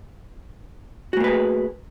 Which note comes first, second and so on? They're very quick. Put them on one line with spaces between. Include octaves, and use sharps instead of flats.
F#4 A3 A#3 B4 G#4